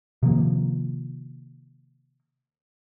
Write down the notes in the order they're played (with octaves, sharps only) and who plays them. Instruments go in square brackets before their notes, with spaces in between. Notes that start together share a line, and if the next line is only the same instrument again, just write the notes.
[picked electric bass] C3 D#3 F3 A#3